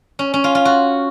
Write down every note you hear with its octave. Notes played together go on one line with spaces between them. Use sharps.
C#4
C#4
F4
F4
F#4